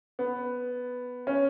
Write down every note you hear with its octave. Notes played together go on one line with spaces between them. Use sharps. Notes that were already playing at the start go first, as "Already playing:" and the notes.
B3
C#4